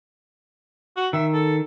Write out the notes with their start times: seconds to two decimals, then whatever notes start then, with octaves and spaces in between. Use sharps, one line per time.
0.97 F#4
1.13 D#3 E5
1.34 A4